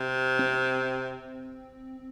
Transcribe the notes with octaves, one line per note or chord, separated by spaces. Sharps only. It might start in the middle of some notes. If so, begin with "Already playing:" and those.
Already playing: C3
C4